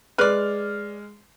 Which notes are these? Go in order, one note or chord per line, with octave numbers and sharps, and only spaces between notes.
G#3 B4 D5 F6